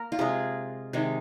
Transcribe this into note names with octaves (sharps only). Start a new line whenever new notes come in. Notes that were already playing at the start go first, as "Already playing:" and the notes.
Already playing: A#3 A#4
F4
C3 G#3 G#4
C3 D#3 G#3